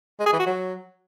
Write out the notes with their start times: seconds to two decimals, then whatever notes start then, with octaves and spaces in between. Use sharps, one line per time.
0.19 G#3
0.26 G#4
0.33 E3
0.39 F#4
0.46 F#3